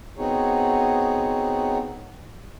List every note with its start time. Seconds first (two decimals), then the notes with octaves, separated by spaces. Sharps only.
0.18 B3 C4 D#4 F#4 G#4 C#5